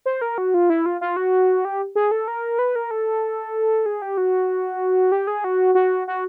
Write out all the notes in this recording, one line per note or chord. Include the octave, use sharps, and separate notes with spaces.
C5
A#4
F#4
F4
E4
F4
F4
F#4
G4
G#4
A4
A#4
B4
A#4
A4
G#4
G4
F#4
G4
G#4
F#4
F#4
F#4